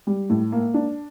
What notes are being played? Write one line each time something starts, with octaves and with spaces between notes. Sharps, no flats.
G3
A2
A#3
D4